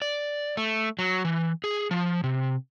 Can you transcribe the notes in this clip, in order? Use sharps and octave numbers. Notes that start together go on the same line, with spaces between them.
D5
A3
F#3
E3
G#4
F3
C3